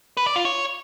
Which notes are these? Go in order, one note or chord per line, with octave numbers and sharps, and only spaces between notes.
B4
D5
F4
C#5